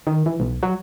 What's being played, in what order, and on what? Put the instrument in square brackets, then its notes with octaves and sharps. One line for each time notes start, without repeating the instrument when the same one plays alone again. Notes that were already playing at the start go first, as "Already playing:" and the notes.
[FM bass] D#3
E3
B1
F#3